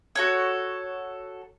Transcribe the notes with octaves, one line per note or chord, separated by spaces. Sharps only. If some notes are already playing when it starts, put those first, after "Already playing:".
F#4 A4 C#5